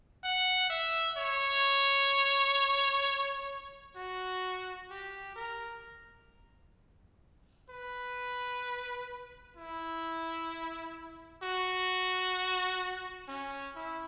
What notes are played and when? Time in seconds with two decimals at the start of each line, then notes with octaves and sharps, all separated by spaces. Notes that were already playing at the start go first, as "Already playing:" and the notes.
0.23 F#5
0.70 E5
1.17 C#5
3.96 F#4
4.90 G4
5.36 A#4
7.69 B4
9.56 E4
11.42 F#4
13.28 C#4
13.76 E4